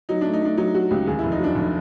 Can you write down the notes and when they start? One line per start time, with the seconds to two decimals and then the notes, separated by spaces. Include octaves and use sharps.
0.09 F#3 D#4
0.21 A3 D4
0.33 D#4
0.42 A3 D4
0.57 F#3 D#4
0.74 F#3 F#4
0.90 C#2 G4
1.07 D#2 G#4
1.19 F1 E4
1.32 D#4
1.39 F#3 D4
1.55 F1